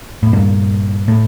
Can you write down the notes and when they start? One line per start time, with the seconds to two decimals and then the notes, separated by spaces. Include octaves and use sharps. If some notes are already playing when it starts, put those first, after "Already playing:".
0.23 A2
0.33 G2 A#2
1.08 A2